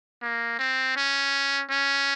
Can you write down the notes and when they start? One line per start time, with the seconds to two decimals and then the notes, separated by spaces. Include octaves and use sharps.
0.22 A#3
0.59 C4
0.96 C#4
1.70 C#4